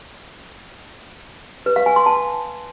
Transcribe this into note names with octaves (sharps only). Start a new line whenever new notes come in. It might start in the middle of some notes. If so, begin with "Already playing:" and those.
B4
F5
G#5
C6
A5